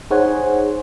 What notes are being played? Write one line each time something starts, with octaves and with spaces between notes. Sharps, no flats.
D#4 G#4 C5 C#5 F#5 G#5